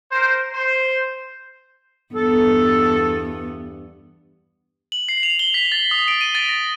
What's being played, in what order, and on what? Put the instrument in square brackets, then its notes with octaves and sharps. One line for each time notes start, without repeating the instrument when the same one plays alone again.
[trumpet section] A#4 C5
C5
[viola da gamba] E2 G2 B3 [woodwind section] A4
[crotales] F#7
C7
F7
G7
B6
A6
D#6
D7
D#7
A6
A#6